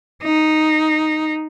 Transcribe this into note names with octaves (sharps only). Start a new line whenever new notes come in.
D#4